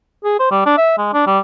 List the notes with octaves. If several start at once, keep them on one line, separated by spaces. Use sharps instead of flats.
G#4
C5
G3
D4
E5
G#3
D4
G3